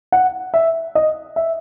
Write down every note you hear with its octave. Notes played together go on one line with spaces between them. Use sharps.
F#5
E5
D#5
E5